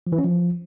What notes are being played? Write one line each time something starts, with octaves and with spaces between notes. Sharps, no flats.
F3
E3
C#4
F3